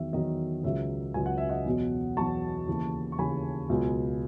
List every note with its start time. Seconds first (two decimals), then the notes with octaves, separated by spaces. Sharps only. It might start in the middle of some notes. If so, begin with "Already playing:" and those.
Already playing: E2 D#3 F#3 E5
0.13 E2 D#3 F#3 D#5
0.63 C#2 C#3 F#3 E5
1.14 C#2 C#3 F#3 G#5
1.26 F#5
1.38 E5
1.49 D#5 F#5
1.66 E2 B2 F#3
2.17 E2 B2 F#3 A5 C#6
2.68 D#2 C#3 E3
3.12 C#6
3.19 D#2 C#3 E3 G#5 B5
3.69 C#2 B2 F#3